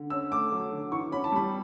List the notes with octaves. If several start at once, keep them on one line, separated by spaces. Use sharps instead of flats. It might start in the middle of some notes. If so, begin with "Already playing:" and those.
Already playing: D3
C#4 E6
A3 D6
F#3
D3
E3 C#6
C#4 B5
A5
G3 B5